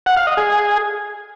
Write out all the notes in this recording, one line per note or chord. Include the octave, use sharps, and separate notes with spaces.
F#5
F5
D#5
G#4